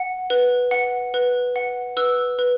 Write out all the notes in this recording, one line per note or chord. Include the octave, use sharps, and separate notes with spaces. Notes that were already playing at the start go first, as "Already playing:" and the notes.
Already playing: F#5
B4
F#5
B4
F#5
B4 E6
B4